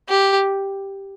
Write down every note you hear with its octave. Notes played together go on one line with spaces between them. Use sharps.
G4